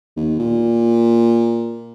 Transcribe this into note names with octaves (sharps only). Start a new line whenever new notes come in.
D#2
A#2